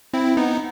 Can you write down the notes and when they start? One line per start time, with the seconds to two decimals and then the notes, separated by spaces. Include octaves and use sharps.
0.14 C4 E4
0.37 B3 D#4